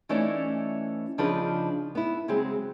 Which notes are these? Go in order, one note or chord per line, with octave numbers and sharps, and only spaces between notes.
E3 A3 C#4 D#4 E4 D5
C#3 F3 D4 D#4 G#4 B4
B3 E4
C#3 F#3 G#3 C4 G#4